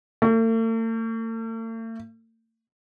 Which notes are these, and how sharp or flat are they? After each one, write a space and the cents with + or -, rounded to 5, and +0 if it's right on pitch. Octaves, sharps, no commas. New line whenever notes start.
A3 +45